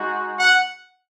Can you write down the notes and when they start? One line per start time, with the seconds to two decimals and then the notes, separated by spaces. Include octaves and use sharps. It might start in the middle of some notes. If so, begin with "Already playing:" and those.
Already playing: G#3 D#4 F#4
0.38 F#5